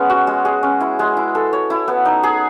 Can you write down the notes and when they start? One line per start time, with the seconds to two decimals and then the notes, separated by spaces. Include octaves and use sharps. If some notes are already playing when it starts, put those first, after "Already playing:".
Already playing: G#3 B3 C#4
0.10 F#4
0.27 G#3
0.45 G#4
0.63 C#4
0.80 E4
0.99 G#3
1.17 E4
1.35 A4
1.53 C#5
1.70 E4
1.88 B3
2.05 D#4
2.23 G#4